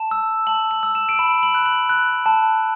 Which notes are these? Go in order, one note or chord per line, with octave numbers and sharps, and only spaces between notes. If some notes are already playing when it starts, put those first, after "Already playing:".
Already playing: A5 E7
E6
A5 F#7
F#7
E6
E7
D7
B5 E7
F#7
F#6
F#7
F#6
A5